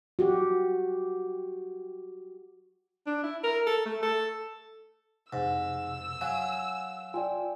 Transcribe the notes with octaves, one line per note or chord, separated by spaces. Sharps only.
F#4 G4
D4
E4
A#4
A4
A3
A4
F2 G#2 C3 E6
F#3 F5 G#5
F4 D5 G5 G#5